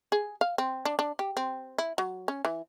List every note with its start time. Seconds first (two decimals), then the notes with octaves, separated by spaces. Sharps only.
0.12 G#4
0.41 F5
0.58 C4
0.85 D4
0.99 D4
1.19 G4
1.37 C4
1.78 E4
1.98 F#3
2.28 C#4
2.45 E3